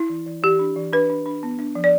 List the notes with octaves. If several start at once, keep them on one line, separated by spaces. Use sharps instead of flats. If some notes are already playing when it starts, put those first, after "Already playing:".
Already playing: E4
E3
E3
E3 G4
D4
E3
D4 B4
D4
D4
B3
D4
F3
D5